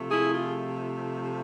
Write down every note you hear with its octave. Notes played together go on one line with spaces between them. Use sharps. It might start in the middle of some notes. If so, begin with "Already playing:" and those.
Already playing: C3 F3 A3
E4 G#4
F4